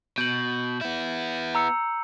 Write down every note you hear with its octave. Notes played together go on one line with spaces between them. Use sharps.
B2 G6 F#7
B3 E4
A#5 E6 C#7